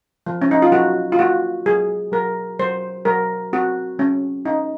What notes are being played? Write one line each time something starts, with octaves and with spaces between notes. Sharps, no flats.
F3
C#4
D#4
F4
F#3 F#4
F4
A#3 F#4
F#3 G#4
F#3 A#4
F#3 C5
F#3 A#4
C4 F#4
F#3 C#4
C#4 D#4